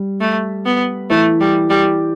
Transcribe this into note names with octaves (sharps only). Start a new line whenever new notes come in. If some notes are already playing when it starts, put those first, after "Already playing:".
Already playing: G3
A3
B3
E3 A3
G3
G3